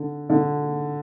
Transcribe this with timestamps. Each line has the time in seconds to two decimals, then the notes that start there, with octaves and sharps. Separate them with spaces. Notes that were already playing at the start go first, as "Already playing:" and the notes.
Already playing: D3
0.30 D3